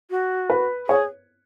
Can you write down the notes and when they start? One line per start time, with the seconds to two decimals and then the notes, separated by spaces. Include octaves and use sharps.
0.10 F#4
0.50 B4
0.88 G#4 C#5